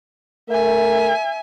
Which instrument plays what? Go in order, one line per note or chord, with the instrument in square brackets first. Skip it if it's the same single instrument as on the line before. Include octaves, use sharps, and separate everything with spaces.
[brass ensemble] A3 A#4 [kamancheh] E5 G#5